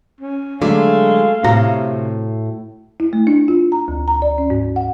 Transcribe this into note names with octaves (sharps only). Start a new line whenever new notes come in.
C#4
D3 F#3 G#3 A3 F5
A2 C3 F#4 A#5
E4
A3
D4
F4
A#5
D2
A#5
D5
C#4
G#2
F#5